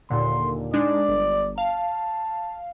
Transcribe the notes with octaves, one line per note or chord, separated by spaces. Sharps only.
D#2 A#2 D3 C6
G#3 D4 D#4 D5
G1
F5 A5